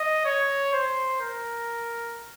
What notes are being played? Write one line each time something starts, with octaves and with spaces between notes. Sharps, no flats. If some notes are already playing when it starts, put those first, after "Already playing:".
Already playing: D#5
C#5
C5
A#4